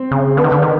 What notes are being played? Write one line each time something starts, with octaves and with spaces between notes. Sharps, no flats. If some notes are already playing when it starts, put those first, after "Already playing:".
Already playing: C4
C#3
D3 B3
D#3
D3
D#3